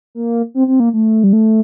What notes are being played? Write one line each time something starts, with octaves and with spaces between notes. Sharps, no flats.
A#3
C4
C4
A#3
A3
G3
A3